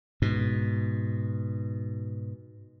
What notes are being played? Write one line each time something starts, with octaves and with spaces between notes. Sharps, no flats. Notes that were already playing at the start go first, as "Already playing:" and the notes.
G#2 B2